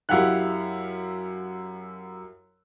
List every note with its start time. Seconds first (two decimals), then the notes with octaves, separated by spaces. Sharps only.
0.09 F#2 E4 G4 F5 F#5 F#6